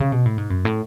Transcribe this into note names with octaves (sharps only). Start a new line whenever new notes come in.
C#3
B2
A2
G#2
F#2
A2